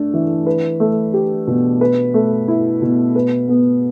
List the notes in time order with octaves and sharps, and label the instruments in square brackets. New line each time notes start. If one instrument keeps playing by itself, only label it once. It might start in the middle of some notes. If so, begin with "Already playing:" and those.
Already playing: [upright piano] A3 D4
E3
B4
A3
G4
B2
B4
A3
E4
B2
B4
B3